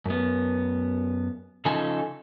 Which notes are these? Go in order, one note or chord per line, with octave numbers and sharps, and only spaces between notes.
F#2 B3
C#3 F3 D#4 A4 G#5